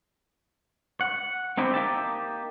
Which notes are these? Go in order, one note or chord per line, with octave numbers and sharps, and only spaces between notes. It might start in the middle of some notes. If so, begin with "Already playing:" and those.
F#5
C4 D#4 E4 G4 C5
A#3 D#4 G4 E5 A5